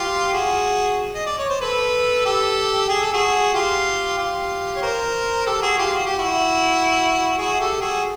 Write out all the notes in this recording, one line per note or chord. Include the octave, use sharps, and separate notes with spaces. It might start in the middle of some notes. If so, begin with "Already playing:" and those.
Already playing: F4 G4
F#4 G#4
D#5
D5
C#5
C5
A4 B4
G4 A4
G#4
A4
F#4 G#4
F4 G4
F4 G4
C#5
A#4 C5
G4 A4
F#4 G#4
F4 G4
F#4
G4
E4 F#4
F#4 G#4
G4 A4
F#4 G#4